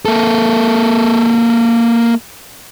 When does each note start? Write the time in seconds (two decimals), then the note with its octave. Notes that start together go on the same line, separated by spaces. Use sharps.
0.06 A#3 A4